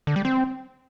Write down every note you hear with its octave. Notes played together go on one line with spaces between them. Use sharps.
D3
G3
C4